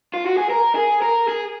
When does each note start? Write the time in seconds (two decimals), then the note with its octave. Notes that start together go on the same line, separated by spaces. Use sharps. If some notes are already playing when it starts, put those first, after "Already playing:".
0.14 F4
0.26 F#4
0.38 G#4
0.50 A#4
0.75 G#4
1.02 A#4
1.28 G#4